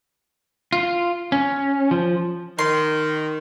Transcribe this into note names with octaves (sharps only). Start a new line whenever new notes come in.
F4
C#4
F3
D#3 C6